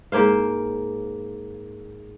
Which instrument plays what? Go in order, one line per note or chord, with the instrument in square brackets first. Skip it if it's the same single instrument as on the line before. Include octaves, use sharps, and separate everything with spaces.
[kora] G#2 A#3 C5 F5